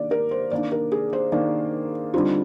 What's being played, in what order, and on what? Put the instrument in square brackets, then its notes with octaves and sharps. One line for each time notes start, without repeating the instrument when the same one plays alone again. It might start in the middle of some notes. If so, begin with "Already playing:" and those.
Already playing: [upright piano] D#3 A#3 D4 [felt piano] D5
[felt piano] A#4
C5
[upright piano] D#3 A#3 D4 [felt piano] D5
[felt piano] A#4
G#4
C5
[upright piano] D#3 A#3 D4 [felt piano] D5
[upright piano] D3 G3 C4 D#4 [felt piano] F4